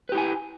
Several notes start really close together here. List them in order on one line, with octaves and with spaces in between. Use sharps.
B4 G4 E4 G#5